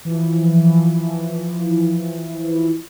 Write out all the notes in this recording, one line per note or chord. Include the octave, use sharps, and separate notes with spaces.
E3 F3